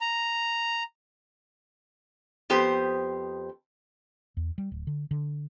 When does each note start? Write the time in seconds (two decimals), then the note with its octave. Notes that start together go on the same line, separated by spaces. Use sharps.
0.01 A#5
2.50 F2 B3 G4 C5
4.37 E2
4.58 G3
4.72 D1
4.87 D3
5.11 D3